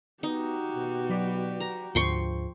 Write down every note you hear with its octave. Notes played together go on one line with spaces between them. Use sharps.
B3 D#4 F#4 G4
B2
F#3 B4 D5
A#5
D2 G#2 F3 G5 C6 C#6